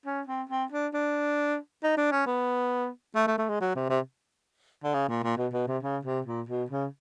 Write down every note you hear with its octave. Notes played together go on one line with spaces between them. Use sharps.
C#4
C4
C4
D4
D4
D#4
D4
C#4
B3
A3
A3
A3
G#3
F#3
C3
C3
D3
C#3
A#2
A#2
B2
B2
C3
C#3
C3
A#2
B2
C#3